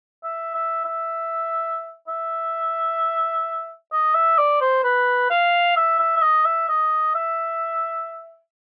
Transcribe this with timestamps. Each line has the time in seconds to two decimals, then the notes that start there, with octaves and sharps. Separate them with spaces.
0.24 E5
0.54 E5
0.85 E5
2.08 E5
3.92 D#5
4.15 E5
4.38 D5
4.61 C5
4.84 B4
5.30 F5
5.76 E5
5.99 E5
6.17 E5
6.22 D#5
6.45 E5
6.69 D#5
7.15 E5